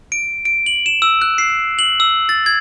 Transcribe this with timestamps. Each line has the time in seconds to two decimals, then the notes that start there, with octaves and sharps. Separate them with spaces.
0.12 D7
0.45 D7
0.66 F#7
0.86 E7
1.02 E6
1.22 F#6
1.38 C7
1.79 F#7
2.00 E6
2.29 A6
2.46 G#6